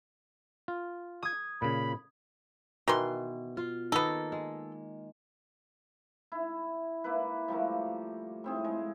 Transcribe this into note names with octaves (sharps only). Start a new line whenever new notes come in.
F4
D#6 G#6
A#2 C#3 B5
B2 D#3 E3 C6
F4
D#3 A#3 B3 A4
G#3
E4
A#3 E4 B4
F3 G3 A3 A#3
A2 C4 G#4
G#3